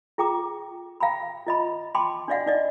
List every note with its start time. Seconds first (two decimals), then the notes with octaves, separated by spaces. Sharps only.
0.18 F4 G#4 G5 A#5 D6
1.00 F5 G5 A#5 B5
1.47 F4 D#5 B5
1.95 G5 A5 B5 C6 D6
2.28 D4 F#4 D5 D#5 F5 F#5
2.46 D#4 D5 D#5